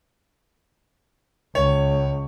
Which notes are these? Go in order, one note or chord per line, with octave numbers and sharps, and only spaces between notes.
C#2 C#5